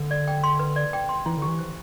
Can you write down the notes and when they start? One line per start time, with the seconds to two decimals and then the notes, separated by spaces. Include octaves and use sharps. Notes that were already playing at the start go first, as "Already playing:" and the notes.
Already playing: D3
0.11 D5
0.28 G5
0.43 C6
0.59 B4
0.76 D5
0.93 G5
1.09 C6
1.26 E3 E4
1.37 D3 G4
1.47 E3
1.59 C5